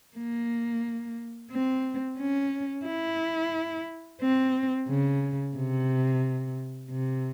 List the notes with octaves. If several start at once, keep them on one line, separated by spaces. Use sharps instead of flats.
A#3
C4
C#4
E4
C4
C#3
C3
C3